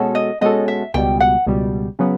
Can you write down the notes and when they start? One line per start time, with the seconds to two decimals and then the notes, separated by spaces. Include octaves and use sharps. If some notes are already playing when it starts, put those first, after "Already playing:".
Already playing: B2 G#3 C#4 F#4 A4
0.15 D#5
0.41 B2 G#3 C#4 F#4 A4 D#5
0.68 E5
0.94 C#2 B2 G3 G5
1.20 F#5
1.47 C#2 B2 G3
1.99 C#3 F#3 B3